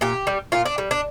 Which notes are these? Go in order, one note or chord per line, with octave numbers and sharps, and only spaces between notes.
A#2 G4
G3
A#2 F4
D4
G3
D4